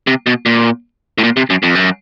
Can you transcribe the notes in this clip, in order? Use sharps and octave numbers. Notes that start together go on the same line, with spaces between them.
C3
B2
A#2
A2
A#2
C3
F#2
F2
F#2